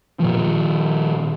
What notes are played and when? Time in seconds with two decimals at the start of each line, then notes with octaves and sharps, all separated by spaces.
0.20 A#2 D#3 F3